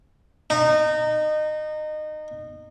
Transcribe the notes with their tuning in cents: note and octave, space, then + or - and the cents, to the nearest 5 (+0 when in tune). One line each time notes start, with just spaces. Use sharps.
D#4 -25